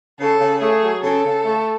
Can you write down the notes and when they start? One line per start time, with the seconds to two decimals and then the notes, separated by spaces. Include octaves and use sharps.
0.20 C#3 A4
0.40 C#3
0.61 A3 G#4
0.83 F#3
1.04 C#3 A4
1.25 C#3
1.45 A3